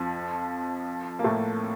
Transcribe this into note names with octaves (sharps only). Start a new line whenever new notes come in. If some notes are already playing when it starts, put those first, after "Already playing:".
Already playing: F2 F3
A#3
A2 A3